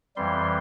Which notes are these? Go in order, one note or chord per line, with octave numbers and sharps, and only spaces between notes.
F2 E3 G3 C6